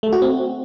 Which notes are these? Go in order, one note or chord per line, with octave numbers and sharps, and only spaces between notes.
A3
F#4
C4